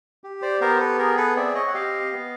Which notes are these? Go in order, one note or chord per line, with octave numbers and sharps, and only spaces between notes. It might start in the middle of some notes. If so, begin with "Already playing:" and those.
G4
C5 D5
B3 A#4 C5
C5
A4 B4
G#4 A#4
A4 B4
C4 D5 E5
C#5 D#5
F#5
G4 D#5 F5
B3